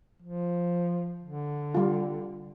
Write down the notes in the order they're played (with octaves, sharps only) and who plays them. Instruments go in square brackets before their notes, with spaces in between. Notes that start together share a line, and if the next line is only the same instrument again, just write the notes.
[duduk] F3
D3
[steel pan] G3 F4